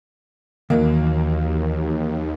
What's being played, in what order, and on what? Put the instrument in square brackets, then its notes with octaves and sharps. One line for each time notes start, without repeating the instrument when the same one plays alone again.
[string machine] D#2 [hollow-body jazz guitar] D#3 E3 F#3 [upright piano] A#3